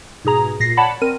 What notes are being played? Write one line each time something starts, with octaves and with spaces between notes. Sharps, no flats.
G#2 B2 G#4 A#5
A#2 A#6 C7
C#5 D5 F#5 A5 B5
C4 A#4 D#7